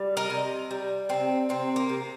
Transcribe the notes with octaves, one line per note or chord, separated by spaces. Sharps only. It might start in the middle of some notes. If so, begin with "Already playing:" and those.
Already playing: G3
A#4 D#5
C3
G3
C3 C4
C3 C4
A#3
C3